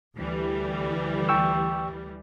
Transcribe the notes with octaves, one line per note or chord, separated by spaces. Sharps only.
D2 E3 G3
G5 C#6 E6